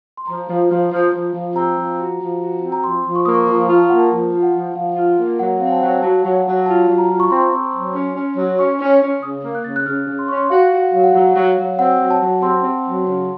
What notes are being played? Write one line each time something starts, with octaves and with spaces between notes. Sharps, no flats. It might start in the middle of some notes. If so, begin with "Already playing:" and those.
C6
F3 A#5
F3
F3
F3
F3
F3
C4 A#5
F3
F#4
F3
F#4
C4
A#5
F3 C6
F3
C#6
A#3 D#6
C#6
F3 A#5
F4
A5
A#3 F#5
A5
F3 A5
F4
F#5
F3
F3 F5
F4
A#3
F#3 F#5
C4 F5
A5
F#3 F#5
F#3 A5
F#3
F#5
F#3
F4 A5
F#3
A#5
F4
C#6
C4 C6
C4
F#3
C#4
C#4
F#3
C#4 C#6
C#4
C#6
C#4
C#3 D#6
A#3
F#6
C#3 A6
F#6
C#3 F6
C#3
C6
C#4 C#6
C6
F#4 F5
F#4
F#5
F#3 F5
F#5
F#3 F#5
F#3
F#3
C4 F#5
F#3
A5
F#3
C4 C6
C4
F#3
C#3